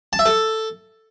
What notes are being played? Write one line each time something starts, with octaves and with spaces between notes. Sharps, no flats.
A5
E5
A4